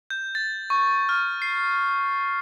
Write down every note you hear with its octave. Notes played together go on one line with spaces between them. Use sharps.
G6
A6
C#6
F6
C7